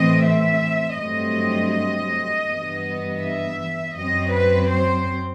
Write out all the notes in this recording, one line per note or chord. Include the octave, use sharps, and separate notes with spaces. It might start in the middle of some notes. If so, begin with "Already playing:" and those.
Already playing: A2 E3 A3 C4 D#5
E5
G2 F#3 A3 C4 D#5
G2 E3 B3
E5
F#2 F#3 C4 D#5
B4
C5